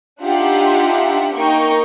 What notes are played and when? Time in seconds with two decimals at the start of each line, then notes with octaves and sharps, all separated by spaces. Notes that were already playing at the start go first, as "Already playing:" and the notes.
0.20 D4 D#4 F4 G4 E5 F#5
1.34 A#3 D#4 G5 C#6